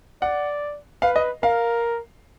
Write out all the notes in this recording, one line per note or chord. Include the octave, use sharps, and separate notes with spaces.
D5 F#5
B4 F5
D#5
A#4 F5